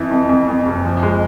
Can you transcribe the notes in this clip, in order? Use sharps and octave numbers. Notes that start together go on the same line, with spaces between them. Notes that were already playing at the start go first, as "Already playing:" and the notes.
Already playing: F2 E3
F2
F2
F2
F#1
F3
G#3